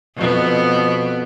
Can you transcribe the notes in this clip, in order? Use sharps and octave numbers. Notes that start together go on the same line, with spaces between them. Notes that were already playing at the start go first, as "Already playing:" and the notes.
F2 B2 B3